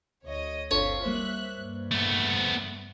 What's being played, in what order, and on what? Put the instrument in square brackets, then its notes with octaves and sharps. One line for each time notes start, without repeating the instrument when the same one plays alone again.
[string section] D2 C#5 D#5
[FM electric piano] G1 D4 A4 [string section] C4 F4 B6 [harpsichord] C#5
[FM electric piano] G3 A#3 C5 [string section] E5 F#6
[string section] G2
[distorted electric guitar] A3 B3